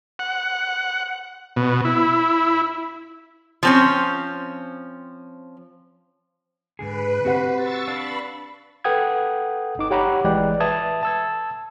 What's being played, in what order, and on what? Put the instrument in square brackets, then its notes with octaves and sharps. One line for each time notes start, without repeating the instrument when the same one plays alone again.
[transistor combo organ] F#5
B2
E4
[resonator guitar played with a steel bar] F3 C4 C#4
[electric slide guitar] G#2 D3 G#4 [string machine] B4
[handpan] C4 G4 F#5 [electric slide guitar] F#4 C5
[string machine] C#6 E6 A6
[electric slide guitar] D4 F5 [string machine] B5
[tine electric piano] A4 B4 F#5 G5 D#6 G#6
G1 D#4 D6
G4 C#5 F#5 A#5 B5 D6
A1 E3 G#3 D5 G5 F#6
B4 E5 A5 D#6 G#6
A5 E6 G#6